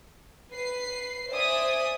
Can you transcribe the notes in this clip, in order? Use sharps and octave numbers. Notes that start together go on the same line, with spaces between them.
B4 C7
C5 D5 E5 G#5 D#6